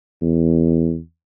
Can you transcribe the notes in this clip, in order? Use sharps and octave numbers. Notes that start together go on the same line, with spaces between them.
E2